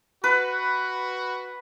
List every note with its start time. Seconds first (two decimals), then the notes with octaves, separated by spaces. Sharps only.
0.24 F#4 B4